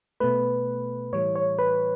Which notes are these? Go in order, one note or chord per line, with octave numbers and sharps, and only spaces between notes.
B2 A3 B4
A2 E3 G3 C#5
C#5
B4